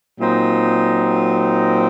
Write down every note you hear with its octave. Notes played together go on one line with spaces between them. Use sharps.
A#2 F#3 C4 D#4